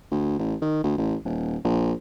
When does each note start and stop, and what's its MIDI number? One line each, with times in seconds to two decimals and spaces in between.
0.11 0.39 38
0.39 0.55 33
0.62 0.80 51
0.84 0.96 38
0.98 1.15 33
1.25 1.57 27
1.64 1.93 34